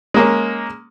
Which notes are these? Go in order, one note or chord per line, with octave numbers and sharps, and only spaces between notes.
G#3 A#3 C#4